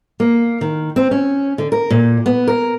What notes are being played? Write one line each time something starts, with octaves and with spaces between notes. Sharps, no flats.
A#3
D#3
C4
C#4
D3
A#4
A#2
B3
A#4